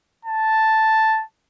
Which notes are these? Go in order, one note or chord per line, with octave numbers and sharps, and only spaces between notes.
A5